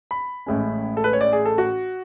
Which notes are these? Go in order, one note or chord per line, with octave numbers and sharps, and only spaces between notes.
B5
A1 A2 G#3 C#4
A4
B4
C#5
D5
G#4
A4
F#4